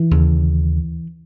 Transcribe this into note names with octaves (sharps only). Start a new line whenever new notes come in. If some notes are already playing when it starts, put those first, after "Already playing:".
Already playing: E3
D#2 C#3